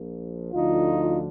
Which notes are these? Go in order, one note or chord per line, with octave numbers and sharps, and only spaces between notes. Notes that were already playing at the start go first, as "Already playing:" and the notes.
Already playing: A#1 A#2 F3
D2 D3 F3 D#4 F4